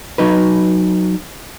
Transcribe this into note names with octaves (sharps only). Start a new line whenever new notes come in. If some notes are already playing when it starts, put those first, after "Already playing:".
F#3 D#4 B4